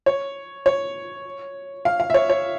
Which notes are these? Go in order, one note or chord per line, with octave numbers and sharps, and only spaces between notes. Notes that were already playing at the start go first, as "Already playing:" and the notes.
C#5
C#5
F5
F5
E5
C#5
C#5